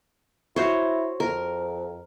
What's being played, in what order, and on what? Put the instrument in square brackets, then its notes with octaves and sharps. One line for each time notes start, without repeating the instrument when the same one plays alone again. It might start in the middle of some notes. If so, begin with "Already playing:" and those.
[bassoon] E4 [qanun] F#4 C5 C#5
[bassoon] F2 [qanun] A#4